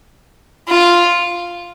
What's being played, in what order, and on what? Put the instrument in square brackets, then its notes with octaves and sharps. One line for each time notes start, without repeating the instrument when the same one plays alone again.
[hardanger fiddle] F4